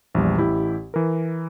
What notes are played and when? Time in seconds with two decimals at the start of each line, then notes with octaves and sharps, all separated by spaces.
0.14 A#1 E2 G3
0.38 A1 E4 G4
0.94 E3 A#4